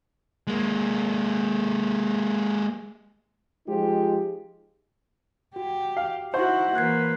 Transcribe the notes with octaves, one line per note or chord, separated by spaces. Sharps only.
G#3 A#3
F3 G#3 D#4 F4 G4
F#4 G4
F5
D#4 E4 F#4 C5 E5 F#5 C#6
E3 A#3 B4 F#6 G#6 C7